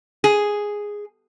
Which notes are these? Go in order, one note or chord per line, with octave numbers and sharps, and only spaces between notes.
G#4